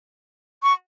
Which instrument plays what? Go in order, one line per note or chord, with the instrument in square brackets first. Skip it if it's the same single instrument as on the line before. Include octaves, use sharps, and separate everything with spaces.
[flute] C#6